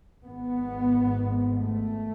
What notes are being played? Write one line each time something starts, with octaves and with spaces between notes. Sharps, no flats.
G#1 G#2 B3
A3